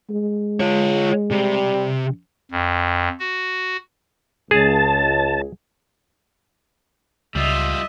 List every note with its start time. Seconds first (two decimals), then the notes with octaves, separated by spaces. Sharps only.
0.10 G#3
0.61 F4 C#5
1.31 C3 G3
2.51 F2
3.19 F#4
4.51 C#2 G#4 A5
7.35 C#2 G3 F4 D#5 E5